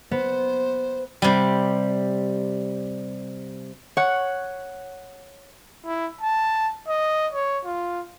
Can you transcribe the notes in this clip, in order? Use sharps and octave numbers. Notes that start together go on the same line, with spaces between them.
B3 C5
C3 G3
C#5 F#5
E4
A5
D#5
C#5
F4